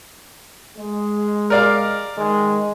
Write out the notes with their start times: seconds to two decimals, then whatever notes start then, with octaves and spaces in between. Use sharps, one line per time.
0.76 G#3
1.50 A#4 D5 F5
2.15 D#3 G#3